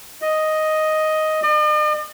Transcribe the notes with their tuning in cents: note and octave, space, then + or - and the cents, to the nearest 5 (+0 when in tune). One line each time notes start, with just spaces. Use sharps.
D#5 +5
D#5 -45